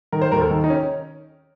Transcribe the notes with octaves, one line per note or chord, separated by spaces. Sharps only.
D#3 A#4
C5
D#2 A#4
A4
D#3
D#4
C#4